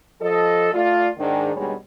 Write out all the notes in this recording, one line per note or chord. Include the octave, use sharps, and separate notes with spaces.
F3 A4 D#5
A3 F4 D5
G#2 D#3 D4
D#2 B2 G3 G#3 D4 C#5